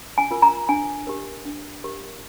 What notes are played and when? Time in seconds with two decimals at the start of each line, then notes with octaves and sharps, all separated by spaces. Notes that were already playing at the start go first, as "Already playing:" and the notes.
0.18 G#5
0.31 F4 A#4
0.42 A#5
0.69 D4 G#5
1.07 G4 A#4
1.45 D4
1.84 G4 A#4